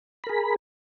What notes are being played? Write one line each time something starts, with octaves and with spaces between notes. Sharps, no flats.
G#4 A#4 B5